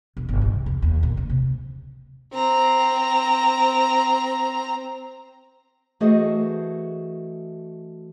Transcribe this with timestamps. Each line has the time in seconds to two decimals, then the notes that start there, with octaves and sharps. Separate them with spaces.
0.17 E1
0.29 G1
0.41 A#1
0.54 C2
0.66 F2
0.82 D#2
1.03 A#2
1.17 C3
1.29 C3
2.34 C4 A#5
6.00 E3 A3 F#4 G#4 C5 D#5